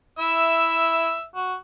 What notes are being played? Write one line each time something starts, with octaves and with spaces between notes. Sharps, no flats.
E4 E5
F#4